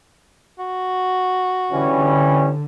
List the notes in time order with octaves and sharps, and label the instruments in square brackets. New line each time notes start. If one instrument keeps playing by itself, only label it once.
[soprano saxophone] F#4
[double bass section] D3 [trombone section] E3 G3 C#4